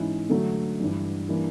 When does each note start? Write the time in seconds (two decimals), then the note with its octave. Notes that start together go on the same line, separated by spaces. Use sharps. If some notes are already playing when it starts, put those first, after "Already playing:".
Already playing: G#2 E3 G#3 C#4 E4
0.29 D3 F#3 A3
0.80 G2 E3 G3
1.29 E3 G3 A#3 D4